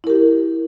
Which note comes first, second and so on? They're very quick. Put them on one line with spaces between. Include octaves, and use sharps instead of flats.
E4 A#4 G4